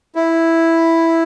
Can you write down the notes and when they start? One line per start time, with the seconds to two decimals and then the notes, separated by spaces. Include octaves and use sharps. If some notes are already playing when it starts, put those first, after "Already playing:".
0.15 E4